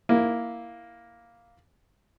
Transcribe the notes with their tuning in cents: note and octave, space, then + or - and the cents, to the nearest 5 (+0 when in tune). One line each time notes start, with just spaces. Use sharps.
A#3 +0 E4 +0